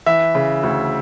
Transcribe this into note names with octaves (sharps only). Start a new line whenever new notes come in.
E3 E5
C#3
D2